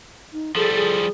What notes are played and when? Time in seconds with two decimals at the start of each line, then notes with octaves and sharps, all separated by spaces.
0.33 D#4
0.56 F3 G3 G#4 A4
0.75 G#4